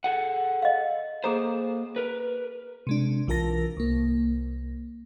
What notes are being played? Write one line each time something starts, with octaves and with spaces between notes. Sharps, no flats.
G#4 A4 F#5
D#5 F5
A#3 G#4 A4 C5 A#5
A#4 B4
C3 G#3 D4
B1 E3 F4 A#4 A5 A#6
C2 A#3